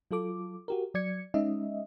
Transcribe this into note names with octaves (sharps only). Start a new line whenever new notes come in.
F#3 F4 A4 D6
F#4 G4 A#4
F#3 D5 G#6 C#7
G#3 C#4 D#4 D#5 E5